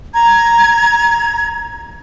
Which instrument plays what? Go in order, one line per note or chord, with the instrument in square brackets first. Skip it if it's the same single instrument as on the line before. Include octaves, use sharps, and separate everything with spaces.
[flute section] A#5 G#6